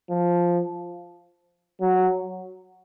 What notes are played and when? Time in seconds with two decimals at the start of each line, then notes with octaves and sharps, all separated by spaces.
0.10 F3
1.81 F#3